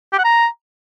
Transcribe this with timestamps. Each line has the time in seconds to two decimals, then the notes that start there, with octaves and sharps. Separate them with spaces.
0.12 G4
0.18 F#5
0.24 A#5